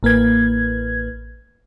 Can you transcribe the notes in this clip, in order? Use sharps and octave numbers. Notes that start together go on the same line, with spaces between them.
A1 A#3 B4 G#6